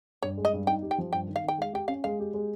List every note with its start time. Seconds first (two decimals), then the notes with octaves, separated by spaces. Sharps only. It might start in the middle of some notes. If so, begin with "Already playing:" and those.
0.22 G2 C#5
0.38 G#3
0.45 D#5
0.53 G2
0.67 D#4 G5
0.82 G4
0.91 G5
0.98 F3
1.13 G2 G5
1.28 D#3
1.36 F5
1.44 D#3 G5
1.58 G#3 F5
1.73 G4 G5
1.88 C#4 F5
2.04 G#3 F5
2.20 G4
2.34 G#3